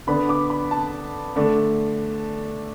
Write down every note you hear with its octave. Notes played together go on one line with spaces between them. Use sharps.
D3 B3 D4 B5
D6
B5
A5
D3 A3 D4